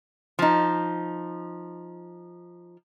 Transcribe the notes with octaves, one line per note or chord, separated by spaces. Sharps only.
F3 D#4